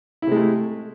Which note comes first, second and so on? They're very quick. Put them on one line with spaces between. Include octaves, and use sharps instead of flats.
E4 C3 G#3 A3